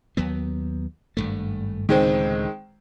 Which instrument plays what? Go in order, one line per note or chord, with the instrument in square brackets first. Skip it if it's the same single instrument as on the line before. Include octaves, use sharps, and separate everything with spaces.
[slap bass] D#2 F#3 B3
G#1 G2 A3
[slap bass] C#2 A2 D3 [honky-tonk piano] D#3 G#3 C4